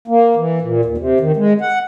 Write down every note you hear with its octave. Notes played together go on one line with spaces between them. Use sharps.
A#3
E3
A#2
D#2
C3
D#3
G#3
F#5